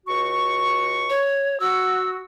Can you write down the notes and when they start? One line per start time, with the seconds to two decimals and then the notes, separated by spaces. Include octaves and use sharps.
0.06 C#2 F#4 C#6
1.10 C#5
1.60 F#4 E6